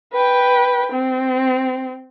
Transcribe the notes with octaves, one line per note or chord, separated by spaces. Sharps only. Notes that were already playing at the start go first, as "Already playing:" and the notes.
B4 G5
C4